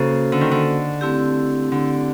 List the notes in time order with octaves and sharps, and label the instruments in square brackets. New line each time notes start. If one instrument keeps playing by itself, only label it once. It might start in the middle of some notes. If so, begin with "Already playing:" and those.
Already playing: [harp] C#3 [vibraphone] A#3 C#4 F#4 A4 C5
[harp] D3
D#3
D3
[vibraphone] A3 C4 E4 G4
[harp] D3